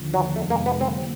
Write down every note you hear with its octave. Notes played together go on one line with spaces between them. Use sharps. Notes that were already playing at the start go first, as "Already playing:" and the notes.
Already playing: D#2 D3 F3
F#3
F2 C3 D#3 G#3 A3 B3
A#3
B3
D3 F#3 A#3 C4